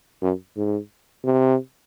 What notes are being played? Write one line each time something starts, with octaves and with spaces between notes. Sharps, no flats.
F#2
G#2
C3